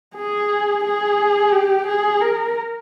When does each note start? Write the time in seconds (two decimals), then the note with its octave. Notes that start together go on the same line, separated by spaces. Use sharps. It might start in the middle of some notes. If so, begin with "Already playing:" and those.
0.16 G#4
0.85 G#4
1.52 G4
1.87 G#4
2.21 A#4